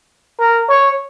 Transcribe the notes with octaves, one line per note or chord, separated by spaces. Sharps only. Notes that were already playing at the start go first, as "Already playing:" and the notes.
A#4
C#5